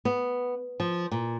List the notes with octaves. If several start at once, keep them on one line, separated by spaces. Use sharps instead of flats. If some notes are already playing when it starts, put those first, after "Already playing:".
B3
F3
A#2